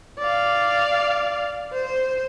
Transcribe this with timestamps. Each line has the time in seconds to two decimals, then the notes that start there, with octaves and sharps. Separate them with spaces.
0.19 D5 F5
1.73 C5